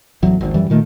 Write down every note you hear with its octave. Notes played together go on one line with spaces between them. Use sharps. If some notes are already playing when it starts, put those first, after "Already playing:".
A1 E2 E3 F#3
G#1 D#2
F#2 E3 G3
A#2 D#3 A3